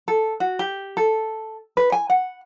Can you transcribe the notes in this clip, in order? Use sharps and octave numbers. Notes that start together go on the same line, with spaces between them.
A4
F#4
G4
A4
B4
G#5
F#5